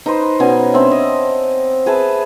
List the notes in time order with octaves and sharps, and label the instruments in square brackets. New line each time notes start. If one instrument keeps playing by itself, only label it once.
[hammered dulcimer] D#4 B4 C5
B2 C#4 G#5
C4 D4 E5
D#5
G#4 B4 E5 A5